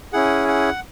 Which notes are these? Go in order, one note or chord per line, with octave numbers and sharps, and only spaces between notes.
C#4 E4 G#4 F#5
F#5